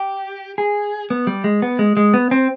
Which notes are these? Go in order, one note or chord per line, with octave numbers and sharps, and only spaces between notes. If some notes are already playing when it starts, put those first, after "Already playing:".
Already playing: G4
G#4
B3
G3
G#3
B3
G#3
G#3
B3
C4